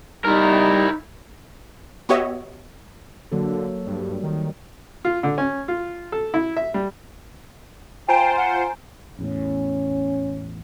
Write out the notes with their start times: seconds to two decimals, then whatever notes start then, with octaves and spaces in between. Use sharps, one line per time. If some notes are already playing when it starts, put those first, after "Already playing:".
0.25 G3 D#4 E4 A#4
2.09 B3 F#4 G4 C#5 D#5 E5
3.32 D3 F#3 A#3 A4
3.87 G2 G3
4.23 D#3
5.05 F4
5.23 D3
5.38 C#4
5.68 F4
6.12 A4
6.34 E4
6.57 E5
6.74 G3
8.09 F4 C5 G5 G#5 A#5 D7
8.37 F#5
9.18 A1 E2 A2 C#4